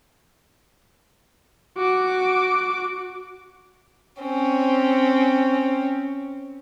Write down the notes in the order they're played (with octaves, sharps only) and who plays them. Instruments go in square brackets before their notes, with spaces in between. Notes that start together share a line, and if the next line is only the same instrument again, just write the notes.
[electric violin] F#4 D6
[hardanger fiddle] C4 C#4